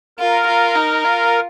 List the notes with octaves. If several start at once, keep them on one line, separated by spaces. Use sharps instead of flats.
F4 A#4
F4
D#4
F4